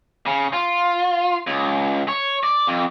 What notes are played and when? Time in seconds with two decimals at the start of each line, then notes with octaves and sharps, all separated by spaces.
0.26 C#3
0.53 F4
1.47 C#2
2.08 C#5
2.43 D5
2.67 F2